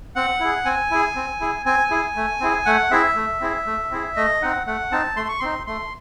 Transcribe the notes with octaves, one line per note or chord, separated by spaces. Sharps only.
C4 F#5
E4 G#4
C4 G#5
E4 G#4
C4
E4 G#4
C4 G#5
E4 G#4
A3
C4 E4 G#4
A3 F#5
C4 E4 G#4 E5
A3
C4 E4 G#4
A3
C4 E4 G#4
A3 D#5
C4 D#4 F#5
A3 F#5
C4 D#4 A5
A3 C6
C#6
C4 D#4 C6
A3 C6